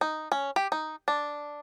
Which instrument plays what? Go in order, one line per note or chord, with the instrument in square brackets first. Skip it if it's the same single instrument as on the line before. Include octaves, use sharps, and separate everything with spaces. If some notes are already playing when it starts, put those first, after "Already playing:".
[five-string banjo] D#4
C#4
G4
D#4
D4